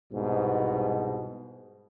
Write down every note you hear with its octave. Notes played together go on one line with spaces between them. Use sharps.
C2 G#2 B2